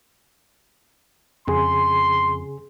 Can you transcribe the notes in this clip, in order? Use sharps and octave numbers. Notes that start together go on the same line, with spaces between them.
F2 C#3 G#4 C6